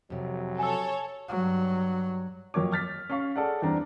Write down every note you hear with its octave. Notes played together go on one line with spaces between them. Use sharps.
F2 C3 F#3
A4 C#5 G#5 E6
G2 F#3
F2 F#3 A#3 C#5 D6
F6 A6 B6
C#4 F5 C#6
G#4 A4 D5 F#5
E2 G3 C4 D4 A#5